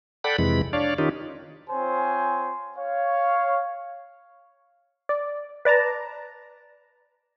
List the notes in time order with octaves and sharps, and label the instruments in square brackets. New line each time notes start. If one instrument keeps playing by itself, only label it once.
[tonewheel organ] A4 D5 F#5 G5 B5
F2 C3 E3 G#3 B5
D4 C#5 D5 F5
D#3 C#4 D#4 F4 G4
[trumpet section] C4 F4 C5 C#5 G#5
C#5 F5
[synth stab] D5
B4 D5 A5 A#5